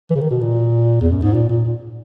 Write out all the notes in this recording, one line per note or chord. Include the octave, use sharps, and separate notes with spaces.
E3
C#3
D#3
B2
A#2
E2
F#2
G#2
A#2
A#2
A#2